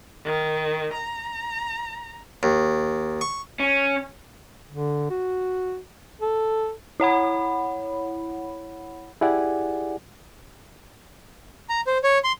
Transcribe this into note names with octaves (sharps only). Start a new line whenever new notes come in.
D#3
A#5
D#2
C#6
C#4
D3
F#4
A4
E4 C#5 F#5 B5
E4 G4 G#4 D5 F#5 G#5
A#5
C5
C#5
C6